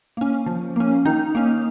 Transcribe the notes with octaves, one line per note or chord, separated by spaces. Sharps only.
A#3 C#4
F3
A#3 C#4
D#3 D#4
A#3 C#4